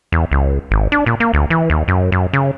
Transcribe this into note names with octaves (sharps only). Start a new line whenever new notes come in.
E2
C#2
G#1
D4
A#2
A#3
D2
E3
D#2
F#2
F#2
C#3